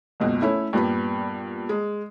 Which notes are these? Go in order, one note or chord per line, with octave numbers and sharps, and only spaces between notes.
F#1 C#2 B2
A3 C#4 E4 C#5
G2 A#2 G3 B3 B5
G#3